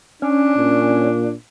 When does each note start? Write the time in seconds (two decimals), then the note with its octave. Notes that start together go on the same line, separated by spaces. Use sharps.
0.22 C#4 D4
0.57 A#2